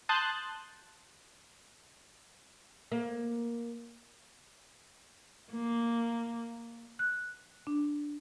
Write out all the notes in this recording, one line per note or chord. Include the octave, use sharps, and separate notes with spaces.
A5 C6 D#6 F#6 G6 A6
A#3
A#3
F#6
D4